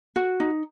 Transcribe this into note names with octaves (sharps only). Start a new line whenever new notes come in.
F#4
D#4